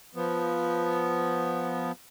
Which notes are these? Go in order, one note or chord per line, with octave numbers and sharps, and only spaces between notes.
F3 B3